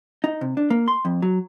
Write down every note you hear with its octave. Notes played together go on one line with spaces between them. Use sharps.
D#4
C3
D4
A#3
C6
F2
F#3